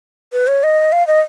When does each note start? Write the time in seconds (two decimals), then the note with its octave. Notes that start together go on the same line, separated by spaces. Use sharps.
0.33 B4
0.47 C#5
0.63 D#5
0.92 F5
1.07 D#5